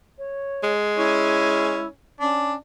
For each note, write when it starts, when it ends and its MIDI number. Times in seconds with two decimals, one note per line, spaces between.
0.18 0.72 73
0.63 1.85 56
0.97 1.88 61
0.97 1.87 64
2.20 2.56 61
2.20 2.53 62